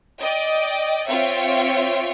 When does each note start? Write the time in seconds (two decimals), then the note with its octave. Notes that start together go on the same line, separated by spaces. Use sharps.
0.18 D5 D#5 G5
1.08 C4 F4 C#5 E5 G5 C#7